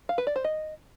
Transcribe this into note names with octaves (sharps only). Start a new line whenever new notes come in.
F5
B4
D5
C5
D#5